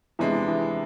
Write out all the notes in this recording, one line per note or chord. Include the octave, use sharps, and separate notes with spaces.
E2 C3 E3 G#3 D4
E3